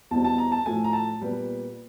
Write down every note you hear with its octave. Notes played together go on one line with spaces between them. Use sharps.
E2 B2 G3 C4 A5
A5
A#5
A5
A2 F3 A3 G#5
A#5
A5
A#2 G3 B3